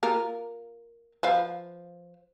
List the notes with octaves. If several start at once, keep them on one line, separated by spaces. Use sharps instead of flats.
A#3 F4 A#4
F3 B4 F5